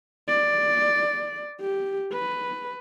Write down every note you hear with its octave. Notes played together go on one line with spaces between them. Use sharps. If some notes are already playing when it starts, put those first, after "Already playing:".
D5
G4
B4